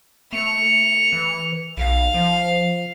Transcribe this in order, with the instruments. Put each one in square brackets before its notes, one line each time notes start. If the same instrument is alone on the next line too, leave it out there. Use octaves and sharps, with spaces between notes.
[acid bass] A3 [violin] C#7 F7
[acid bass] E3
[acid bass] B1 [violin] F5
[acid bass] F3